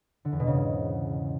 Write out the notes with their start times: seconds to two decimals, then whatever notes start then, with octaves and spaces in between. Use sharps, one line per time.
0.25 D3
0.32 E2
0.40 B2
0.47 C#3
0.54 G#2